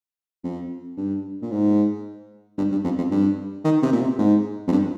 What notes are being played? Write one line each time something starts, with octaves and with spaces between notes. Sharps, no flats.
F2
G2
A#2
G#2
G2
G2
F2
F2
G2
D#3
C3
A#2
C3
G#2
F2
G2